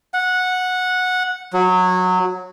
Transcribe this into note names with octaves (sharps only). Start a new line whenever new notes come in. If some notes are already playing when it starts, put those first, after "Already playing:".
F#5
F#3